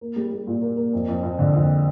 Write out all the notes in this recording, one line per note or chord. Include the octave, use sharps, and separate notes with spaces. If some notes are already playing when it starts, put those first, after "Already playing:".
A#3
G3
G3
A#2
A#3
A#3
F2
F2
F2
D3
F2